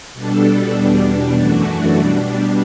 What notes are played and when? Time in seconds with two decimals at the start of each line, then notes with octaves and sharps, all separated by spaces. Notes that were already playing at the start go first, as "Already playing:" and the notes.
0.14 B2 G3 D4 A4
0.74 E2 B2 G3 D4
1.33 F#2 E3 A3 D4 F#4
1.93 B2 G3 D4